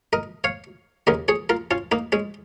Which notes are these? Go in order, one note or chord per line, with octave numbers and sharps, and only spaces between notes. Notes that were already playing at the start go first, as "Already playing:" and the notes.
A#4 D#5
C#5 F5
D#2 C#3 A#4 D#5
G#4 C#5
F4 A#4
C#4 F4
A#3 D#4
G#3 C#4